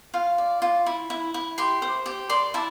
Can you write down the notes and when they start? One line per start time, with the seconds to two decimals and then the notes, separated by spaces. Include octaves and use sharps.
0.14 F4 F5
0.38 D5
0.62 F4
0.86 E4
1.10 E4
1.34 E4
1.58 G4 C6
1.82 C5
2.06 G4
2.30 D5 C6
2.54 E4 A5